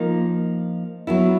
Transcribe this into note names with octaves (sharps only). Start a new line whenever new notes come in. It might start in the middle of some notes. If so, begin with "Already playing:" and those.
Already playing: F3 A#3 D#4
F#3 B3 E4